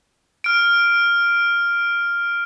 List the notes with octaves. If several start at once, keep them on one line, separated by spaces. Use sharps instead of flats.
F6 D7